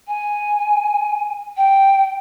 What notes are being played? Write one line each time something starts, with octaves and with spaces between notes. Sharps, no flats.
G#5
G5